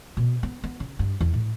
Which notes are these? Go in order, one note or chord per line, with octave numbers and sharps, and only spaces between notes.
B2
B3
B3
C#3
G2
E2
A2